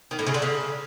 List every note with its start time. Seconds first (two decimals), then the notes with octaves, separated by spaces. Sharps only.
0.11 D#3
0.19 A2
0.27 C#3
0.34 D3
0.42 C#3